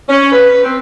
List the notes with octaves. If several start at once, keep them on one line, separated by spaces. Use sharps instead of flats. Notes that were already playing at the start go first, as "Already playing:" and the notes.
C#4
B4
C4